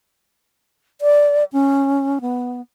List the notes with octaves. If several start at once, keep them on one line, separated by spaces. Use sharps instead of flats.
D5
C#4
B3